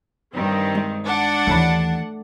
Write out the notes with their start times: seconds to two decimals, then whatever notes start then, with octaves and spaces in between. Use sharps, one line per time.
0.33 G2 D#3 C4
0.75 G#3
1.04 D4 F#5
1.47 D#2 E3 A3 C#5 B5